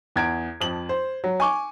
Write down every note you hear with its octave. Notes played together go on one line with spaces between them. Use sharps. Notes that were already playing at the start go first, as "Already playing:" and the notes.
E2 G#6 D7
F2 F3 F#7
C5
F#3
G#5 C#6 D6